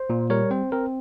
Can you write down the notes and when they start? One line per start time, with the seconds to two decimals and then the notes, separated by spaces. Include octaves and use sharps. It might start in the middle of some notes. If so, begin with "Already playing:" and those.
Already playing: C5
0.10 A#2
0.30 G3 A#4 C#5
0.51 C4 C5
0.72 C4 A#4